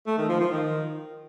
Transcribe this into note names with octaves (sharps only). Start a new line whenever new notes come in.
A3
D#3
F3
F3
D#3